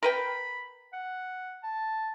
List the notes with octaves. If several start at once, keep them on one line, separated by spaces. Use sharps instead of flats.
A#4 B4 G5 B5
F#5
A5